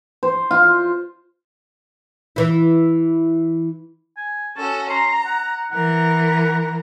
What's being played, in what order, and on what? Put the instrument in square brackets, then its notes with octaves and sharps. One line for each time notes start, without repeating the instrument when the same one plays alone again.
[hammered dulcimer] C5
F4
[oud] E3 E4
[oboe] G#5
[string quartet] C#4 F#4 A4 [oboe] A5
[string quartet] A#5 [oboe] C6
[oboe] F#5
[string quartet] E3 A#4 [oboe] F#5